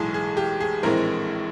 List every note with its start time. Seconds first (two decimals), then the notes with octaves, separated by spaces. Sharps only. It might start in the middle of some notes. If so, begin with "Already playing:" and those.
Already playing: B1 A2 E3 G#3 G#4
0.14 G#4
0.37 G4
0.60 G#4
0.83 A#1 A2 E3 G#3 C4 A#4